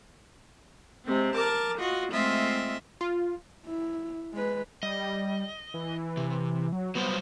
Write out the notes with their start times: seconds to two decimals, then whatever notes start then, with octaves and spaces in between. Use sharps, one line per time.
1.06 C3 G#3 C4
1.35 A#4 A5 D6
1.79 F4 F#4 D#5
2.12 G#3 A3 C4 F4 D#5 E5
3.01 F4
3.66 E4
4.33 G#3 B4
4.83 G3 D#5
5.74 E3
6.17 C3
6.72 F#3
6.95 F#3 G3 B3 C5